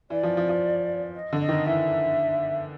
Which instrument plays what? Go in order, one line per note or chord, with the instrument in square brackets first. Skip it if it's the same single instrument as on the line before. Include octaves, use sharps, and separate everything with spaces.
[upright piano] E3 [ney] D5
[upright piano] F3
F3
F3
[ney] D#5
[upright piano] D3
[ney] D#5
[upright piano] D#3
[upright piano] E3 [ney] E5